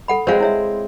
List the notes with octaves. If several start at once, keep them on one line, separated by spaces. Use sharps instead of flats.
A4 F#5 B5
G#3 C4 C5 F5
E4 C#5 E5